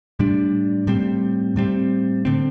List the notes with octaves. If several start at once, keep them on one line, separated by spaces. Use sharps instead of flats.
A2 G3 D4
A2 G3 C4
A2 G3 C4
D3 A3 C4